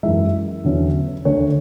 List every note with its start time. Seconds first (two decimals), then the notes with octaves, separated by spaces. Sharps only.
0.03 F#2 E3 G#3 E5
0.64 E2 D3 F#3 C#4
1.25 D2 D3 A3 D4 C#5